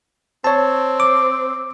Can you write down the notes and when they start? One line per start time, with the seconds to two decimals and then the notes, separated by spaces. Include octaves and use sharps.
0.44 C4 C#5 A5
1.00 D6